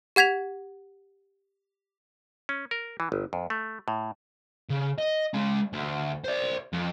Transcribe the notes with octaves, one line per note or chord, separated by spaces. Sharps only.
G4 F#5 G#6 B6 F7
C#4
A#4
E3
G1
F2
A3
A2
C#3
D#5
G#3 C#4
D2
C5 D5
F2